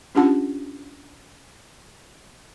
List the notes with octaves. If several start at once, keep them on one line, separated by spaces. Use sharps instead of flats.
C#4 D4 F4 G4 F#5 A5